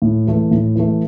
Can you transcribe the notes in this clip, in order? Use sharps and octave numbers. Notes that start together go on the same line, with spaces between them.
A2
E3 A3
A2
E3 A3